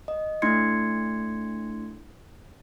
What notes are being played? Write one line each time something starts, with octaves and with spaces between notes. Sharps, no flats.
D#5
A3 D4 E4 C6 G#6 C#7